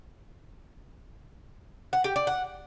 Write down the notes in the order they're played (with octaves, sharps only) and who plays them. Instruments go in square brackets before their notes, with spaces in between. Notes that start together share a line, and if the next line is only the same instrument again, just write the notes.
[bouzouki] F#5
G4
D5
F#5